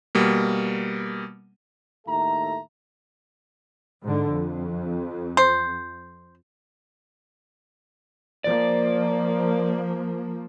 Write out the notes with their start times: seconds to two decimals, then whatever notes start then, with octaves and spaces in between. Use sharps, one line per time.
0.15 B2 G3 A#3
2.07 D#2 A2 A4 E5 A#5
4.03 G#2 D3
4.32 F2
5.37 C5
8.44 F3 A#3 D5